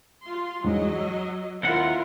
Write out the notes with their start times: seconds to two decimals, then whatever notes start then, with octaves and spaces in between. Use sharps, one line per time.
0.23 F4 C6
0.64 E2 G#2 F#3 D#5
1.01 E6
1.63 D#2 C4 E4 F4 A#4 F#5